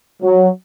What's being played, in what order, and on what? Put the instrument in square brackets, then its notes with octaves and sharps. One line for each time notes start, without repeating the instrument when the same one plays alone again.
[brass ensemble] F#3